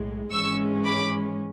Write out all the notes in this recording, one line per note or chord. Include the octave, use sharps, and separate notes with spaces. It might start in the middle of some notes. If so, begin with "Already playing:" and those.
Already playing: B1 A2 G#3
G#1 G#2 E3 G#3 C#4 C#6 E6
B5 D6